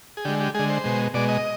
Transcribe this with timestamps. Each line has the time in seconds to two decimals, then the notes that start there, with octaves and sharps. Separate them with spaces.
0.17 G#4
0.25 D3 G#3 G4
0.40 G4
0.54 D3 G#3 G#4
0.70 C5
0.84 B2 G#3
1.14 B2 G#3 D5
1.29 D#5